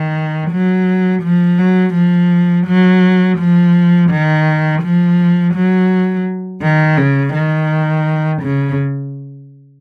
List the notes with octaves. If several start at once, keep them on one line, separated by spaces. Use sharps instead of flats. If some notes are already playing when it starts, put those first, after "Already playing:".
Already playing: D#3
F#3
F3
F#3
F3
F#3
F3
D#3
F3
F#3
D#3
C#3
D#3
C#3